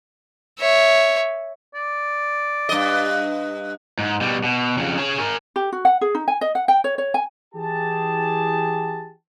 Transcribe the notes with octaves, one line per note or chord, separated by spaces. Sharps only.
C#5 E5
D5
G2 D#5
G#2
B2 G3
B2
F2 C#3
G#4 C#5
A#4 G#5
G4
F#4
F#5
G#4
D#4
G#5
D#5
F#5
G5
C#5
C#5
G#5
E3 G4 G#4 A5